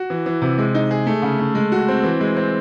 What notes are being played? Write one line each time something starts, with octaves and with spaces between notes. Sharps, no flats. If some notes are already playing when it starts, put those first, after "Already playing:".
Already playing: F#4
E3
E3
C3
G#3
D#4
G#4
A3
C#3
A3
G#3
F#4
C4
E3
G#3
C4